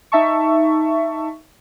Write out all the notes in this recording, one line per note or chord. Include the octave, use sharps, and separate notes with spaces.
D#4 E5 A5 C#6